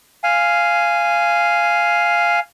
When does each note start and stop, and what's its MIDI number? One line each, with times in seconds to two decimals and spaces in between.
0.24 2.40 77
0.24 2.40 80